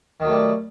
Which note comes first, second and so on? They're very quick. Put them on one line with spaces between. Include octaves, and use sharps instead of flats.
D#3 F#3 A3 G3